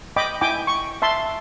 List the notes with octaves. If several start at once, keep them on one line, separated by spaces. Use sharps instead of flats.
D#5 G5 B5 D6
E4 G5 G#5 D6
C#6
E5 A5 C6